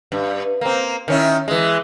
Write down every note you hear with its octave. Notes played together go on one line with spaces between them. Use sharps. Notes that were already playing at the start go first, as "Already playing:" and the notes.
G2
A#3 C4
D#3 C#4 E4
E3 G#3